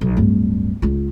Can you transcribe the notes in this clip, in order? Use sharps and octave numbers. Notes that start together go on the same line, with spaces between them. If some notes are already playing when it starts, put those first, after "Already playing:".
B1
D1 G2
C#2 F4